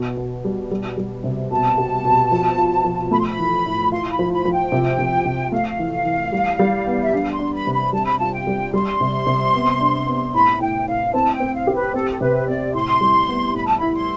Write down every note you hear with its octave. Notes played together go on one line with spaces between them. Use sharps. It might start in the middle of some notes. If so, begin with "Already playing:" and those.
Already playing: B2
B2
G3
G3
G3
C3
B2 A5
G4
B2
F3
F4
F3
A3 B5
C6
B5
E3
A2
F4 C6
B5
F3
B5
F3
G5
C3
C3
C3
A3 F5
E3
E3
G3
G3
B3
E5
D4 F5
C6
D4
B5
C3
B5
G3 A5
B5
F4 A5
G5
G3
G3 C6
C3
C3
B3
D4
B3
A2 B5
A2 G5
A2 F5
C4 A5
G5
C4
F5
G4
B4
C4 A4
A4
C3 B4
C4 D5
A2 C6
G3
B3
A2 B5
A5
E4 B5
C6